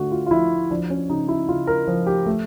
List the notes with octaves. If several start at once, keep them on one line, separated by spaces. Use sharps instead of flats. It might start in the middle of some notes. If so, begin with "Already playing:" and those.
Already playing: D3 A3 F#4
F4
F4
F3 E4
F3 D4
C#4
C#3 D#4
E4
C#3 F4
A#4
F3
G4
A3